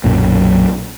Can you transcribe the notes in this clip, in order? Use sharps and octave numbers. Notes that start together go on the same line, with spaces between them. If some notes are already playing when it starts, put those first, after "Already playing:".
B1 F#2 A#2